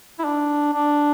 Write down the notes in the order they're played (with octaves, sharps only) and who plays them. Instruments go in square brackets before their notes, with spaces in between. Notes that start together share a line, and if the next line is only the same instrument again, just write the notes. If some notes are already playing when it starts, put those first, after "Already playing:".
[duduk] E4
D4
D4